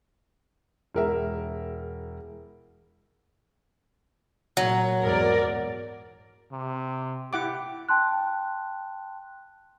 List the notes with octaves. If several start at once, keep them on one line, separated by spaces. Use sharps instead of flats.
E1 A#4 E5
A#2 F#3
E2 G#2 A#4 D5
C3
E4 G4 F#5 D6
G5 A5 C6 F#6